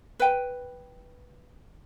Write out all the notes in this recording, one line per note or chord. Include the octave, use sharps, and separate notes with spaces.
B4 G5